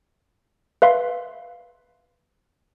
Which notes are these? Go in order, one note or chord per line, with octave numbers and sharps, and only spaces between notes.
B4 E5 F5 C6